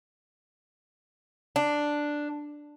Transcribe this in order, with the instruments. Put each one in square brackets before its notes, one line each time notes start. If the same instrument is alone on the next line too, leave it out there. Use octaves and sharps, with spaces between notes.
[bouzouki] D4